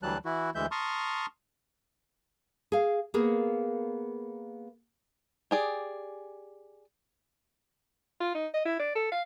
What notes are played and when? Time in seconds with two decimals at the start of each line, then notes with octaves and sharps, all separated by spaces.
0.03 D2 E3 F#3 G3 A5 F#6
0.25 E3 E4 F#4
0.55 D2 E3 G#3 E5 G6
0.71 A5 A#5 C6 C#6 D#6 F6
2.72 G#4 F5
3.14 A#3 B3 G#4 A#4
5.51 G4 G#4 D5
8.20 F4
8.34 D#4
8.54 D#5
8.65 E4
8.79 D5
8.95 A4
9.12 F5